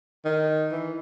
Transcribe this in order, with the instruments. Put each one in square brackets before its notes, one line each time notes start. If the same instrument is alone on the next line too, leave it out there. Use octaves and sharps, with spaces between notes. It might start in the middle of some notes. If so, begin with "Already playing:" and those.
[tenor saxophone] D#3
E3